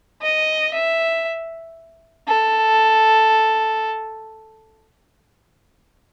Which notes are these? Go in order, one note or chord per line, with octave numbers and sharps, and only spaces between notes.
D#5
E5
A4